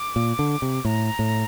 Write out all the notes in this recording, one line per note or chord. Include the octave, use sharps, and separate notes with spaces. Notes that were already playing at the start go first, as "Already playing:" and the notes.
Already playing: D6
A#2
D3
C3
A2 A#5
A2